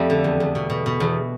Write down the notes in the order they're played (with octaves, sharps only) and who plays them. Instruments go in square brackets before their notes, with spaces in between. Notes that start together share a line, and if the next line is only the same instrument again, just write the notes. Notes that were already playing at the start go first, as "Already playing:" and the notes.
Already playing: [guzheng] F2 G3 A3
D3
E2
E2
B2
B2
B2
E2